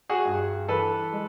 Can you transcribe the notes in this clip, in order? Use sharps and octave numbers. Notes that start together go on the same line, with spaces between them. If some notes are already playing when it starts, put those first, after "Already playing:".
F#4 G#4
G2
E3 A4 B4
G#3